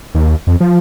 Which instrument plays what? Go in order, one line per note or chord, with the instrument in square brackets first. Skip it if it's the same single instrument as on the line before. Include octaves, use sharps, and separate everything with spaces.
[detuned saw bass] D#2
F2
F3